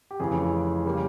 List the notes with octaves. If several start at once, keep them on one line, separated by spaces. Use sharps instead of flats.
G4
F1 F2 C#3 E3 G#4
C#3 G3 A#3